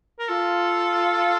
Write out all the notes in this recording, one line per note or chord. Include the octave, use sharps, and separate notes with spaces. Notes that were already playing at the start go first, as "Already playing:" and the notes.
A#4
F4 A4